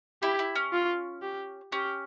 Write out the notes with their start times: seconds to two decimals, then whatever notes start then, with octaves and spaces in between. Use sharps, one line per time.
0.22 E4 G4
0.39 E4
0.55 C#4
0.72 F4
1.22 G4
1.72 C#4 G4